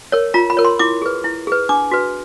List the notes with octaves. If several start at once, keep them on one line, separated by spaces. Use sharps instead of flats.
A#4 C#5
F4 A#5
B5
A#4 C#5
C6
E4 D6
G#4 B4
E4
G#4 B4
D4 D6
F#4 B4